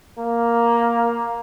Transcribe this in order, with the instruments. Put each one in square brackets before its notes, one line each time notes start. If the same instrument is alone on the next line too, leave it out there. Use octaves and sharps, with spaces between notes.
[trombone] A#3